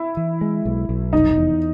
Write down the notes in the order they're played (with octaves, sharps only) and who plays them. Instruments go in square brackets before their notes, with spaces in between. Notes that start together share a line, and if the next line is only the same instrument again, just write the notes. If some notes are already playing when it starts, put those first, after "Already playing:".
Already playing: [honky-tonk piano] E4
[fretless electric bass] E3
G#3
B1
B1
[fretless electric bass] F1 [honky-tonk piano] D#4
[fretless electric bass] E2